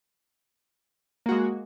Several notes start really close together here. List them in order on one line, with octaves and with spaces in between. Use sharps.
A#3 F#4 G#3